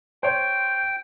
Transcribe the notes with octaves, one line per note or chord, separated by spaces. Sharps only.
C5 C#5 G5